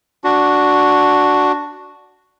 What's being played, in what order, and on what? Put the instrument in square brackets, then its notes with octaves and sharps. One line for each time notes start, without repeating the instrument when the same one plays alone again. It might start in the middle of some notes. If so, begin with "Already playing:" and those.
[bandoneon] D4 F#4